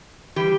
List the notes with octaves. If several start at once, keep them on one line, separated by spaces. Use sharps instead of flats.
E3 G3 G4